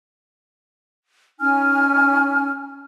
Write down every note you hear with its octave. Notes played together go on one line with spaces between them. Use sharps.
C#4 D#4 G#5 F6